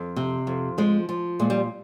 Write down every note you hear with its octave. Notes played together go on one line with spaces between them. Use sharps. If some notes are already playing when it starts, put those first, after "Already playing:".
Already playing: F2
C3
F2
F3 G#3
F3
A#2 G#3
G3